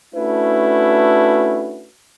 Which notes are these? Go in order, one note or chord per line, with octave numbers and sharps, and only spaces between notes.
A3 C#4 D4 E4 F#4 B4